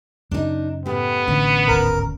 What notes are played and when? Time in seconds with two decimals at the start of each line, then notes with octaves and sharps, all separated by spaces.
0.31 F#2 C#3 D4 D#4
0.86 A2 B3 G4
1.28 A1 A2 D3 C#4
1.68 D1 G#1 D2 A#4